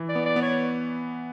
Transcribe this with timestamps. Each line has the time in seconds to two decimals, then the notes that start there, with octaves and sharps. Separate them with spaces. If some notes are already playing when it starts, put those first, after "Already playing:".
Already playing: E3
0.09 D5
0.15 B3
0.26 D5
0.36 B3
0.42 C#5